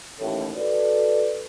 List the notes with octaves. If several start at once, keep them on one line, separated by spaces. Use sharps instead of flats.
A1 D#2 A2
F#4 A4 B4 D5